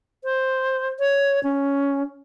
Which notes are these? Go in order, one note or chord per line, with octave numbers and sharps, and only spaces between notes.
C5
C#5
C#4